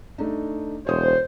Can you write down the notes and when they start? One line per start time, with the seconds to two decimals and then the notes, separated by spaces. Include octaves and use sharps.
0.18 A3 D4 D#4
0.87 E1 C5 C#5 D#6